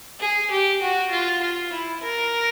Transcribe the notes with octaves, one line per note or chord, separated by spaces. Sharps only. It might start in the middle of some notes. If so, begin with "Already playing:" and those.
G#4
G4
F#4
F4
F4
E4
A#4